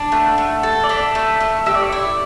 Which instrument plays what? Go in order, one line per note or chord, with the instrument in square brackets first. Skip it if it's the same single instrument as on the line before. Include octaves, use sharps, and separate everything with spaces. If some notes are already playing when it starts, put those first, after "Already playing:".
Already playing: [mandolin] D4
[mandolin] A3 [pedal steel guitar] F#5
[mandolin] A3
A4
[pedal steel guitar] D5
[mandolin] D4 [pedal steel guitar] E5
[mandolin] A3
A3
[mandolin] G4 [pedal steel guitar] E5
[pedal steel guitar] D5
C#5
[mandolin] E4 [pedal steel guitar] D5